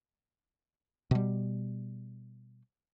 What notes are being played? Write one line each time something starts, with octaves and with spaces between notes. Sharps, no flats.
B2 G3